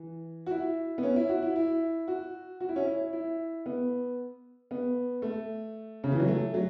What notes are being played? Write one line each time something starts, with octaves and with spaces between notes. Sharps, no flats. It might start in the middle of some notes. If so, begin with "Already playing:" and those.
Already playing: E3
F#4
E4
B3
C#4
E4
F#4
E4
E4
F#4
F#4
E4
C#4
E4
E4
B3
B3
A3
C#3
E3
F#3
A3
F#3